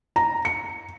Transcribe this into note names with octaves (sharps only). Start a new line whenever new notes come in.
A#5
C#7